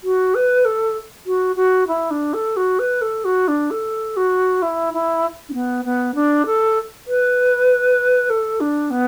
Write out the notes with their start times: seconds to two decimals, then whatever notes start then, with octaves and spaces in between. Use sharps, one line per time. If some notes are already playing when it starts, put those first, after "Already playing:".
0.03 F#4
0.34 B4
0.65 A4
1.26 F#4
1.55 F#4
1.87 E4
2.10 D4
2.33 A4
2.56 F#4
2.79 B4
3.01 A4
3.24 F#4
3.47 D4
3.70 A4
4.16 F#4
4.62 E4
4.93 E4
5.48 D4
5.53 B3
5.84 B3
6.14 D4
6.45 A4
7.07 B4
8.29 A4
8.60 D4
8.90 B3